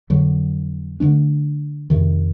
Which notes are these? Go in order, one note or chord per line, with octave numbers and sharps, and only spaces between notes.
F2 D3 F#3
D3 F#3 A3 D4
F2 C3 D#3